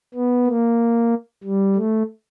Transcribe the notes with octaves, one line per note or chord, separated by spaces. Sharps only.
B3
A#3
G3
A3